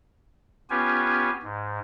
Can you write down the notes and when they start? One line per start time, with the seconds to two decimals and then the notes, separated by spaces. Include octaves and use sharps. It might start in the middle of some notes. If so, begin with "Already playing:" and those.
0.70 B3 C#4 F4 G4 B4 G#5
1.43 G#2